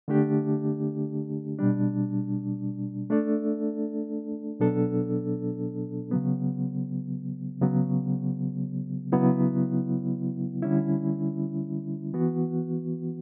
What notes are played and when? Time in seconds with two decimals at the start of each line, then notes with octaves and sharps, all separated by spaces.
0.08 D3 A3 D4 G4
1.59 B2 G3 D4
3.10 A3 D4 A4 D5
4.60 B2 F#3 B3 D4 A4
6.11 C#3 F#3 B3
7.61 C#3 F#3 B3
9.12 C#3 F#3 B3 E4
10.63 D3 G3 C#4 E4
12.14 E3 B3 F#4